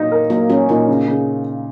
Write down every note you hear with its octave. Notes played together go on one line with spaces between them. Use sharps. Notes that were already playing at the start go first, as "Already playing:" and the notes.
Already playing: A#2 F#3 D#4
A#4
F#3 A#3
F#3 C#4
A#2 D#4
C#3
C#3